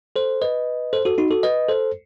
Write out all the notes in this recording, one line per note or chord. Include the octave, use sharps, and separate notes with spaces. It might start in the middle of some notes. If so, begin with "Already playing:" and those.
A4 C5
B4 D#5
A4 C5
F#4 A4
D#4 F#4
F#4 A4
B4 D#5
A4 C5